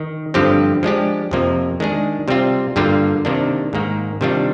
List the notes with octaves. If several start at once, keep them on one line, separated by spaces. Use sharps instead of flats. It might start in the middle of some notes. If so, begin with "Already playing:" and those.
Already playing: D#3
G2 D3 F3 C4 G4
F3 G#3 D4 G4
F2 C3 F3 A#3
D#3 G#3 D4 G#4
C3 G3 C4 F4
G2 D3 G3 A#3 F4
C3 D#3 A#3 D4
G#2 D#3 A#3
C3 D#3 G3 D4 F4